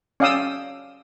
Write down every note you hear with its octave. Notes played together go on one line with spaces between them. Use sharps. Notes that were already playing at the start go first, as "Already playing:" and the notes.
C#4 D5 F5 G5 D#6 E6